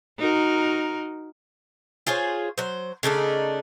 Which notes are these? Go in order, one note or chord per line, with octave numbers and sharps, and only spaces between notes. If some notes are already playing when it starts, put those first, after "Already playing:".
D#4 F#4 A#4
F4 G#4 C5 C#5
F#3 C5
C#3 A3 D4 D#4